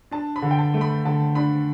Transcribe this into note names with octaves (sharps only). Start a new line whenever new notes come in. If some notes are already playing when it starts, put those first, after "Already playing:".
D4 A5
B5
D3
G5
A5
A3
B5
D3 A5
D4 B5